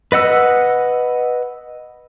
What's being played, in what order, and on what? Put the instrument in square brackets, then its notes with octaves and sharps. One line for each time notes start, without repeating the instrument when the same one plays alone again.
[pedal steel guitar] B4 D#5 F#5 E6